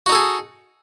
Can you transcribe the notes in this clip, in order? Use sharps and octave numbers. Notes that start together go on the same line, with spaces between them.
D#4 F#4 G#4 A4